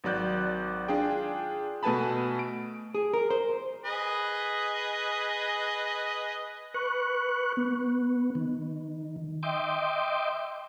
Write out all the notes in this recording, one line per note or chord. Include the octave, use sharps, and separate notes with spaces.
G#1 F#3 D5 F#6 G6
D4 F4 G#4 G5
B2 A3 B4 G#5 A5 B5
D7
G#4
A#4
C5
G#4 B4 D#5
B4 C#6 F#6
B3
D#3
D#5 E5 G5 C6 D6